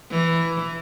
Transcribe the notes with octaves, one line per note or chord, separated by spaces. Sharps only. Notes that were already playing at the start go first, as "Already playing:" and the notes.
E3